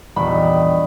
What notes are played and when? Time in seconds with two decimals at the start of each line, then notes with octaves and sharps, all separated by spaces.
0.16 A#1 E2 G2 D#3 G5 B5